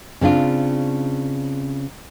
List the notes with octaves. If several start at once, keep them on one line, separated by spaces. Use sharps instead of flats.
C#3 C4 D4 F4